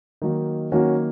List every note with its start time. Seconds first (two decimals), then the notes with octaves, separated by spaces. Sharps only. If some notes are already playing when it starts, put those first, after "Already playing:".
0.22 D#3 F#3 A#3 D#4
0.72 D#3 F#3 A#3 C#4 F#4